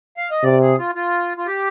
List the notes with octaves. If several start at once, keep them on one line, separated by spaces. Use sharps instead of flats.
F5
D#5
C3 D5
G#4
F4
F4
F4
G4